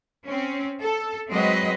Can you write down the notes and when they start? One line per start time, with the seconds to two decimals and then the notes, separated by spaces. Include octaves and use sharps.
0.24 C4 C#4
0.81 A4
1.30 F#3 G#3 C4 F#4 B4 D#5